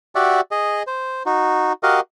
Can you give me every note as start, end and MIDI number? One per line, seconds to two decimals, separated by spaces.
0.15 0.41 66
0.15 0.41 67
0.15 0.41 74
0.15 0.41 76
0.15 0.41 78
0.51 0.83 68
0.51 0.83 75
0.87 1.23 72
1.26 1.73 63
1.26 1.73 66
1.83 2.00 66
1.83 2.00 67
1.83 2.00 70
1.83 2.00 75
1.83 2.00 77
1.83 2.00 78